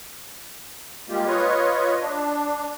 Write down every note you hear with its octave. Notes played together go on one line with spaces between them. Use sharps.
G3 G#3 A#3 F4 G4
F4 B4 C#5 D#5
D4